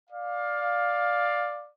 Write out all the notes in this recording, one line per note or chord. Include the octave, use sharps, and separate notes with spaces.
D5 F5